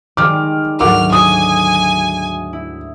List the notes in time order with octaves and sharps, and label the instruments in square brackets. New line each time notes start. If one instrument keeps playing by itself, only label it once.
[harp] D#3 G3 G#3 [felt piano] D6 F6
[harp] D2 G#2 F#3 [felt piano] A#4 F#5 D6 [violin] F6
[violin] G#5 [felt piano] D#6
[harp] E4